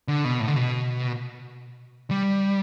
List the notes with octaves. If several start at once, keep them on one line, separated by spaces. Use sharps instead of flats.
D3
B2
A2
D3
B2
G3